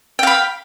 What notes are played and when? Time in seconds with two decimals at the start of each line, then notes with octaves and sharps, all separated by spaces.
0.19 G5
0.23 F5
0.27 B5